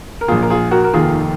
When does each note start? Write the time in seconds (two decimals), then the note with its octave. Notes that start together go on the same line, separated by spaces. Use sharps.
0.21 A#4
0.28 A#1 A#2 F4 G#4
0.42 A#4
0.50 F4 G#4
0.71 F#4 A#4
0.84 A#4
0.94 F1 D#2 D#3 F4 G#4